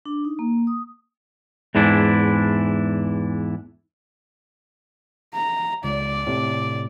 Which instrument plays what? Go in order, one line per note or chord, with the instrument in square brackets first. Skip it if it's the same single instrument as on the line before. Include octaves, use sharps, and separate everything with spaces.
[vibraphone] D4
D#4
A#3
D#6
[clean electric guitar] E2 G#2 E3 D4 E4
[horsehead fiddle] A#5
[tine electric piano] C#2 [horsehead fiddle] D5
[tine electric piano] A2 C3